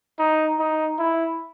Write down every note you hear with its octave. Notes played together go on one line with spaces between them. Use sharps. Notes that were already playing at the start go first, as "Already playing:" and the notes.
D#4
D#4
E4